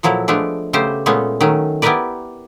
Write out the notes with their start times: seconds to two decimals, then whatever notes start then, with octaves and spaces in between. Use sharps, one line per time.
0.03 A#2 F3 F#3 E4 A4
0.28 F3 G#3 A3 B3 D4
0.73 C#3 A3 B3 G4 C5
1.06 A#2 G#3 A3 B3 C#4 C#5
1.41 D#3 F#3 A3 C#4
1.82 B3 E4 G4 A#4 B4 D5